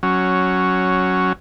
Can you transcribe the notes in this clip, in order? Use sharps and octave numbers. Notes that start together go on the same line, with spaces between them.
F#3 C#4